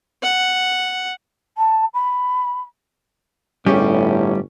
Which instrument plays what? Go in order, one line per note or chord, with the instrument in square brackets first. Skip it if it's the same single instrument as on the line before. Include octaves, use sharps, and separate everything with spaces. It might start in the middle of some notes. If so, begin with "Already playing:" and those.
[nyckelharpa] F#5
[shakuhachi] A5
B5
[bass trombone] G1 [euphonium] A2 [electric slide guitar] G3 [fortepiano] C#4 G4 G#4